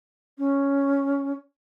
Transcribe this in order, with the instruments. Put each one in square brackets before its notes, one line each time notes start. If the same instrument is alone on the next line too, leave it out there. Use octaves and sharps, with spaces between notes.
[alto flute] C#4